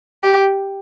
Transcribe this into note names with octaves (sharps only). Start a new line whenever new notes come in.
G4